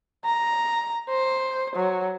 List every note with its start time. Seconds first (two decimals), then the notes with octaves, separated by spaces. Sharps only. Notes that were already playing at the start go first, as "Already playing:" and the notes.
0.25 A#5
1.09 C5
1.75 F#3